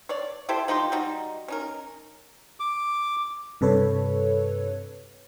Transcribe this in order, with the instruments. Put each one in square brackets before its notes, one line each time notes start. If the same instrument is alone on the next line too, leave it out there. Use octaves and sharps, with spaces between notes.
[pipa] C#5 D5
E4 G4 A4 C5
F3 D#4 G4 C6
G3 D#4 F#4
C#4 D#4 A#4
[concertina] D6
[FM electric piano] G2 C3 A4 B4 C#5